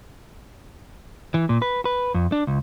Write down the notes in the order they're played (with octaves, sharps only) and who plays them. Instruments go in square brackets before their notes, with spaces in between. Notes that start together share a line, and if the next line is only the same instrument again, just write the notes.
[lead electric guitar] E3
A#2
B4
B4
F2
D4
C#2